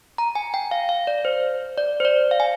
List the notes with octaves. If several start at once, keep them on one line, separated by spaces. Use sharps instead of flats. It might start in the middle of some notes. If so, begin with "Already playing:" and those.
A#5
G#5
G5
F5
F5
D5
C5
D5
C5
D5
F5
G#5